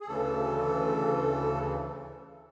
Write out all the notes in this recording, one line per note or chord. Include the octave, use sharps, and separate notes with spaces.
G#4
D2 C#3 E3 A4